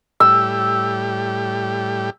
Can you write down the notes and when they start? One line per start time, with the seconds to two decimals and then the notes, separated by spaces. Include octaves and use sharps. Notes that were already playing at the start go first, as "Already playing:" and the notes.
0.20 A2 G3 G4 E6